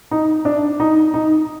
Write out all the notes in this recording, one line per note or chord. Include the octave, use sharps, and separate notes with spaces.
D#4
D4
D#4
D#4